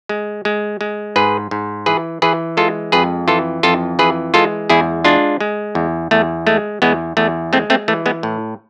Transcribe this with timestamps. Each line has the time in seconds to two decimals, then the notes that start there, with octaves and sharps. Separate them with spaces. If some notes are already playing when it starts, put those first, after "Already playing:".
0.09 G#3
0.45 G#3
0.81 G#3
1.16 G#2 G#4 B4
1.51 G#2
1.86 E3 G#4 B4
2.22 E3 G#4 B4
2.57 G#3 F4 A4
2.92 F2 G#4 B4
3.28 E3 F4 A4
3.63 F2 F4 A4
3.99 E3 G#4 B4
4.34 G#3 F4 A4
4.70 E2 E4 G#4
5.04 G#3 D4 F4
5.40 G#3
5.75 E2
6.11 E2 A3
6.47 G#3 A3
6.82 E2 G#3 B3
7.17 E2 A3
7.53 G#3 A3 C4
7.70 A3 C4
7.88 E3 A3
8.06 G#3 B3
8.23 A2